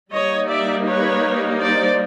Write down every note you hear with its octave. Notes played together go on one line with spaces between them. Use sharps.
G3 A#3 D#4 C#5 D#5
D5 E5
B4 C#5
C5 D5